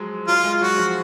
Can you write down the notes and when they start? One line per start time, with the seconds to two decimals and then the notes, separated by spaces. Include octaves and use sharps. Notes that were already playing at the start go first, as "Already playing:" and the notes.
Already playing: F3 F#3 G#3
0.28 F#3 F4
0.44 G#3
0.61 F#3 F#4
0.78 F3